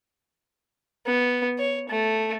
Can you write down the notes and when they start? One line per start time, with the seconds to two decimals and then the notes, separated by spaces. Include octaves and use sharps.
1.06 B3
1.59 C#5
1.89 A3